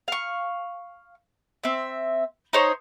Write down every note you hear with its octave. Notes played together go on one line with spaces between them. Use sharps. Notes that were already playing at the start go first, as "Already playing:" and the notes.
F5 C#6
C4 E5
D#4 C5 C#5